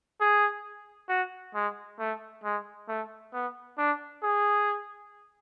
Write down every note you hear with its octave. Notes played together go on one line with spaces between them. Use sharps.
G#4
F#4
G#3
A3
G#3
A3
B3
D4
G#4